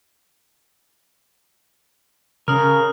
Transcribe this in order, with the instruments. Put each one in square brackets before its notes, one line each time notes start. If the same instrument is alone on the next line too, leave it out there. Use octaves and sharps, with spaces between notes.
[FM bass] C#3 [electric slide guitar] A#4 [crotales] D#6 F6